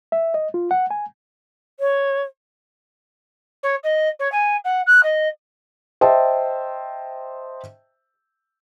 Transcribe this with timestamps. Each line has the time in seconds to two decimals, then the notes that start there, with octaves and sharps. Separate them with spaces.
0.12 E5
0.34 D#5
0.54 F4
0.71 F#5
0.91 G#5
1.80 C#5
3.63 C#5
3.83 D#5
4.19 C#5
4.32 G#5
4.64 F#5
4.86 F#6
5.03 D#5
6.01 C5 D#5 E5 G5 A5